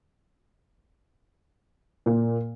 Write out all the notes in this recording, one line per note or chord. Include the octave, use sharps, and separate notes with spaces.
A#2